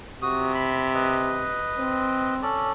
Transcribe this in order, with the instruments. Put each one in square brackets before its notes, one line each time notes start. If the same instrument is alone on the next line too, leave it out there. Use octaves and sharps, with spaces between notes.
[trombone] C3 [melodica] F#4 D#6
[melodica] B5
B4 D#5
[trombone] C4
[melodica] C#4 A4 D5